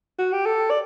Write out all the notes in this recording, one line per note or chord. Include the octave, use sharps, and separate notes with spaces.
F#4
G4
A4
D5